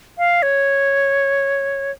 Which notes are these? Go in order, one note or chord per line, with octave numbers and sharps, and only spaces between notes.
F5
C#5